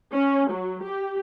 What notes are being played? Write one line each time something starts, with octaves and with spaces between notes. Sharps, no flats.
C#4
F#3
G4